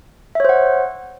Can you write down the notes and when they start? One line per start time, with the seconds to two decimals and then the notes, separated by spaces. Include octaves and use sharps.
0.35 E5
0.40 C#5
0.45 C5
0.49 F#5